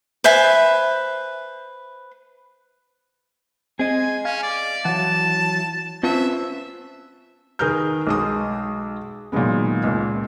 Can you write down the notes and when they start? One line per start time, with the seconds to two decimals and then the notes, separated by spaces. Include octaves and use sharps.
0.24 B4 C5 E5 G#5
3.79 C4 G#4 D#5 G#5
4.25 C#4 F5 G#5
4.43 D5
4.85 E3 F#3 F#5 A5
6.03 C4 C#4 F4 B4 C5 E5 A5
7.59 D#3 G#4 A#4 B4 F6 G6
8.07 B1 G#3 D#6
9.32 A#2 D#3 F#3 G#3 B3
9.83 C#2 A#2